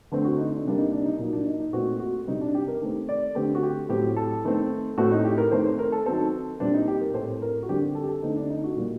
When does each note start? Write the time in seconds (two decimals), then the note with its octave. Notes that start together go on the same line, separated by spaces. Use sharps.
0.12 D3 A3 C4
0.25 F#4
0.38 D#4
0.51 D4
0.65 C3 G3 A#3 D4
0.78 D#4
0.92 D4
1.05 D#4
1.19 A#2 F#3 A#3 D#4
1.33 D4
1.46 D#4
1.60 D#4
1.73 A#2 A3 C4 F#4
2.00 F#4
2.27 C3 G3 C4 D#4
2.41 D4
2.55 G4
2.68 A#4
2.82 D#3 A3 C4
3.09 D5
3.35 D3 A3 C4 G4
3.55 F#4
3.63 G4
3.89 A2 F#3 C4 G4
4.16 A4
4.44 D#3 A3 C4
4.98 A2 A3 C4 F#4
5.12 D#4
5.25 G4
5.38 A#4
5.51 D#3 A3 C4 C5
5.65 C5
5.79 A#4
5.92 A4
6.06 D#3 F#3 C4 A4
6.60 A#2 G3 C4 D4
6.74 D#4
6.88 G4
7.01 A#4
7.14 A2 A3 C4 C5
7.42 A#4
7.63 F#4
7.69 D3 G3 C4 G4
7.82 G4
7.95 A4
8.04 G4
8.09 A4
8.23 D3 A3 C4 D#4
8.36 D4
8.50 D#4
8.64 F#4
8.76 A#2 G3 A#3